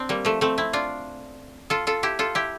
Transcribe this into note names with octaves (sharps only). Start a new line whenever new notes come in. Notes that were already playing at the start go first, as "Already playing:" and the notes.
Already playing: C4 D4
G3 A#3
F3 A3
A3 C4
C4 E4
D4 F4
F4 A4
F4 A4
E4 G4
F4 A4
E4 G4